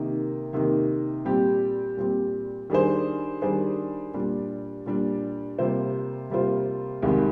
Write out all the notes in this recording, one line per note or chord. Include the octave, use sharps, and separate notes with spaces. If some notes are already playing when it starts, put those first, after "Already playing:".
Already playing: C3 D#3 A#3 D#4
C3 D#3 A#3 D#4
A#2 G3 C4 G4
A#2 G3 C4 G4
D#3 G3 D4 G#4 C5
D#3 G3 D4 G#4 C5
A#2 G3 D4
A#2 G3 D4
C3 G3 A#3 F4 C5
C3 G3 A#3 F4 C5
C2 C3 D#3 G#3